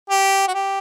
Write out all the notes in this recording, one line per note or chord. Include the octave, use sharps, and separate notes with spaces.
G4
F#4
G4